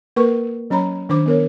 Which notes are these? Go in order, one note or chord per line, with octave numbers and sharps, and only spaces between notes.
A#3 A#4 B4 C#6
F#3 C#4 C#5 A#5 B5
D#3 D4 C5 D6
B3 A#4 C#5